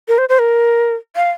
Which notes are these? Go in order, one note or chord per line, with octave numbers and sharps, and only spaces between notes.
A#4
C5
C5
A#4
F5